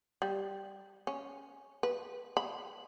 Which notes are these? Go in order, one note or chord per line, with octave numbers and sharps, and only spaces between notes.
G3
C#4
B4
B5